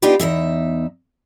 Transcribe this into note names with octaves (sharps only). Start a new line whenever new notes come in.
B3 D4 D#4 F4 G4 B4
E2 C#3 D#4 E5